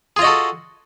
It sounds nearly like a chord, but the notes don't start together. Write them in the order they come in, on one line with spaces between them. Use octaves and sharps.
G#4 F4 D#5 F#4 A4